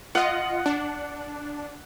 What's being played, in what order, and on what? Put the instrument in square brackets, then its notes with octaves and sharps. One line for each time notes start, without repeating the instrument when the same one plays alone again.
[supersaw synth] F4 D#5 [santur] F#5
[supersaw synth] D4